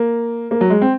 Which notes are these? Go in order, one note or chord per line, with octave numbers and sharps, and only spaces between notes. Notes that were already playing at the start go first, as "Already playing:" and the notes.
Already playing: A#3
A#3
F#3
G#3
C4